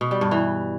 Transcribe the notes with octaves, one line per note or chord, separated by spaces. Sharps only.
B2
G3
G2
E3